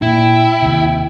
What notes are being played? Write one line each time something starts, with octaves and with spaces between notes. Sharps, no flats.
A#2 E4 G5
D#2 C3